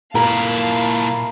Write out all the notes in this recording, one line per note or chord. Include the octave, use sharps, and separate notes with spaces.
A#2 E4 A#4 F5 A5